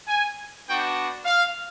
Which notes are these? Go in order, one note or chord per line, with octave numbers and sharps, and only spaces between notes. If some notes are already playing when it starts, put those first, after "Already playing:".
G#5
B3 D4 F#4 G5
F5